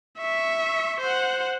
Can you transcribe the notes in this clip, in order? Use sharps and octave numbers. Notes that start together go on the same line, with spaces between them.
E5 C#6
C5 F#5